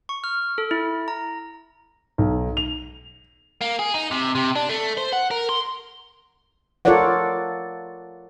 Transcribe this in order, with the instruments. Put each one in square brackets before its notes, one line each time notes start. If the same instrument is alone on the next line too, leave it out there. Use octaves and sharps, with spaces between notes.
[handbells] C#6
F6
A4
E4
A#5
[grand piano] B1
F7
[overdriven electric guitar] A#3
G#4
D#4
C3
C3
D4
A3
C5
F#5
A#4
C6
[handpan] F4 A4 A#4 C#5 D5 F#5